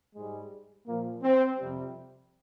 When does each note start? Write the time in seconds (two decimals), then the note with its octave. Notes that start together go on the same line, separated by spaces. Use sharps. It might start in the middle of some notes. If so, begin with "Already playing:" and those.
0.15 G#2 G3 G#3
0.87 A#2 F3 A#3
1.22 C4
1.58 F2 C3 G3